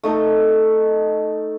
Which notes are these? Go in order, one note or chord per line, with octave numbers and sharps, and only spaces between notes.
A3 D#4 A4 A#4